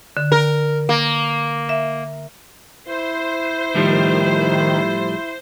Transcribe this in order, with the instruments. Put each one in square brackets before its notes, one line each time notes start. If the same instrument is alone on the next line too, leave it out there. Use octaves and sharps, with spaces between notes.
[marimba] D3
[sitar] A#4
A#3
[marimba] E5
[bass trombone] E4 [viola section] C5
[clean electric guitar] A2 F3 G3 [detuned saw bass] D#3